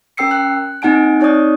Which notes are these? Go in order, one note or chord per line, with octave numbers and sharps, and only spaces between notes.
C#4 A#4 G5 E6 C7 C#7
F#6
A#3 C4 D#4 F#5 G#5 D7
C4 D#4 C#5 D5 D#6